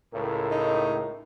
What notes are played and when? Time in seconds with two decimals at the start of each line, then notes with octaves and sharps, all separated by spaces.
0.14 C#2 A2 A#4
0.51 D#4